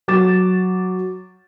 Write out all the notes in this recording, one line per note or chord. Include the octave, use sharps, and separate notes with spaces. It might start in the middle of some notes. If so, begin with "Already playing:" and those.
F#3 D6 A6 E7